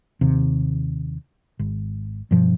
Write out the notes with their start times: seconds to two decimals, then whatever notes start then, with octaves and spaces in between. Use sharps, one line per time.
0.21 D#2 C3
1.59 G#1
2.31 G2 B2 F3